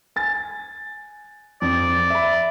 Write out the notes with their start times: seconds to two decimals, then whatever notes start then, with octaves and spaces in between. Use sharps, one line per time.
0.16 G#5 A6
1.62 F2 D5
2.10 E5 B5